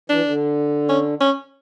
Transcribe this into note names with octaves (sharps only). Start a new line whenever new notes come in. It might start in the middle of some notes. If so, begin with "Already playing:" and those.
E3 D4
D3
C#4
C#4